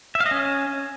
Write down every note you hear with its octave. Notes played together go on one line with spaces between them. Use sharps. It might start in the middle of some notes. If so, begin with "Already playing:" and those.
E5
F5
D#5
C#4